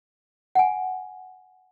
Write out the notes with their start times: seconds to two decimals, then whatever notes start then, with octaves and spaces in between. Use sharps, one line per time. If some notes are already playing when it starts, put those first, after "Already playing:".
0.55 F#5 G#5